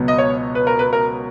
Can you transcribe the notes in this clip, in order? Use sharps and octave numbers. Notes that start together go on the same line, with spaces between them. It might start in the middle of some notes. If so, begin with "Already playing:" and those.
Already playing: C#2 B2 F#3 B3
D#5
C#5
B4
A#4
B4
A#4